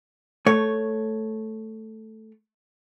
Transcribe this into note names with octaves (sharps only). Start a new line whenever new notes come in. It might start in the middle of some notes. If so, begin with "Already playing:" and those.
A3 C#5